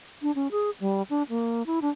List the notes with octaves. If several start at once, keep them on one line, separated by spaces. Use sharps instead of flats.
D4
C#4
G#4
G3
D4
A#3
E4
D4